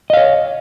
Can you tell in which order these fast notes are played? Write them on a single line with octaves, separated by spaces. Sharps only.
D#5 F5 C#5